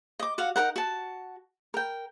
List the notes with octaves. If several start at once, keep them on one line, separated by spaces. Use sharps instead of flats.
D#5 D6
F#4 F5 F#5
D#4 A#4 F#5
F#4 A5
A#4 G5